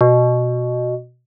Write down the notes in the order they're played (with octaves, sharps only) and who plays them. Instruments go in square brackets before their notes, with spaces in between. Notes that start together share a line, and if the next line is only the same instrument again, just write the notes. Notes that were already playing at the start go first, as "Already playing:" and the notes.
[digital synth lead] B2